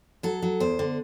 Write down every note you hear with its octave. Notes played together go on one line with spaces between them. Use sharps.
F#3 A4
F#3
E2 C5
D3